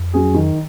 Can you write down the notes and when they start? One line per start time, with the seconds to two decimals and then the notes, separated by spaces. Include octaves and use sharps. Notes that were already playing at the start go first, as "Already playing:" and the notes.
Already playing: F2
0.14 F#3 C#4 G#4
0.34 D#3